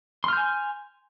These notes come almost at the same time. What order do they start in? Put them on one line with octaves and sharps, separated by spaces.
C6 F6 G6 G#5